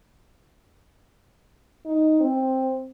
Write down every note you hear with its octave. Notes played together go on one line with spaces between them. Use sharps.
D#4
C4